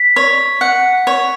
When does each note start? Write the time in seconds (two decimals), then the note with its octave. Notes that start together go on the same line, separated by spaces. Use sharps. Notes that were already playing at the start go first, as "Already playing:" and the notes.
Already playing: B6
0.16 C#5
0.61 F#5
1.07 C#5